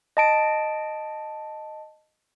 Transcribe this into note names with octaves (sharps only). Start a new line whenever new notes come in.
D#5 A5 D7